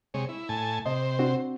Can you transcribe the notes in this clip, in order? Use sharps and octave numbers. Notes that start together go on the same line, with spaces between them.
C3 G#3 C#5
E4
A2 G#5 A5
C3 C5 D#5
C4 D4 F#4